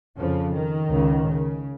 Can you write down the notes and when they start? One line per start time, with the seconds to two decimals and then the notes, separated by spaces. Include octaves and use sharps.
0.17 F2 C#3 F3
0.54 D#3
0.90 C#2 C#3
1.26 C#3